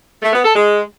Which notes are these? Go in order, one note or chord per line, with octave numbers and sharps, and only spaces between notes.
A3
B3
A4
G#3